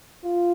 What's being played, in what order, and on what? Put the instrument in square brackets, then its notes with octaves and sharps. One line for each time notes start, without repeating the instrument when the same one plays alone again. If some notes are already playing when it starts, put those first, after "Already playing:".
[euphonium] F4